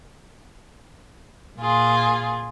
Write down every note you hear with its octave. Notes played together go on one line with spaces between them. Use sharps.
A#2 F4 G#4